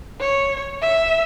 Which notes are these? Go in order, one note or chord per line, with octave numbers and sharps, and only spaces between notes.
C#5
E5